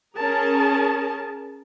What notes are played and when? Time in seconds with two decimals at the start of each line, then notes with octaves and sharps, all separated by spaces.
0.16 C#4 G#4 A#4 A5